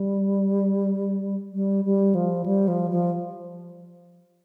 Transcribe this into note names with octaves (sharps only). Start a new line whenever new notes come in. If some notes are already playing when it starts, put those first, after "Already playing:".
Already playing: G3
G3
G3
F3
G3
F3
F3